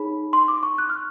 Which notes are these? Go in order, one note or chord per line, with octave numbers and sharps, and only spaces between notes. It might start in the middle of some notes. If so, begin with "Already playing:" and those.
Already playing: D#4 G#4 C#5 B5
C6
D6
C#6
F#6
F6